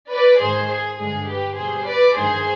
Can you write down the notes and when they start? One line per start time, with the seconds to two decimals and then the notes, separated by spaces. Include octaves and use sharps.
0.11 B4 D5
0.40 G#2 D#3 G#3 G#4 C5
0.70 G#4
0.98 G2 D3 G#3 G#4
1.28 G4 B4
1.57 B2 G3 G#4 C5
1.86 B4 D5
2.15 G2 D#3 G#3 G#4 C5